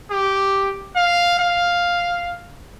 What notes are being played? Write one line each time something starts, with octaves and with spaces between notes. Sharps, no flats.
G4
F5
F5